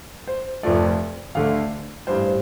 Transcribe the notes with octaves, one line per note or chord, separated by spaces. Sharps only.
C5
F1 F2 F3 A3 D5
D2 D3 A3 F5
A1 G2 G3 C5